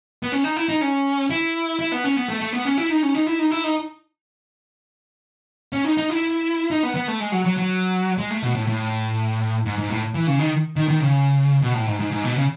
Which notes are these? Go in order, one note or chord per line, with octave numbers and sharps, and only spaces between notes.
B3
C#4
D#4
E4
D#4
C#4
E4
E4
B3
C#4
B3
A3
A3
B3
C#4
E4
D#4
C#4
D#4
E4
D#4
E4
D#4
C#4
D#4
D#4
E4
D#4
B3
B3
A3
G#3
F#3
F#3
F#3
G#3
A3
B2
A2
A2
G#2
G#2
A2
E3
C#3
D#3
D#3
D#3
C#3
B2
A2
G#2
G#2
G#2
B2
C#3